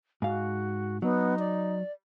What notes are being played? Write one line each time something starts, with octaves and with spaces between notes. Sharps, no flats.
G#2 F#4 F5
F#3 B3 D#4
D5